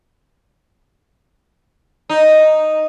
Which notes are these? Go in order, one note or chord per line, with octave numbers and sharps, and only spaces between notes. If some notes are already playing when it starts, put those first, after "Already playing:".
D#4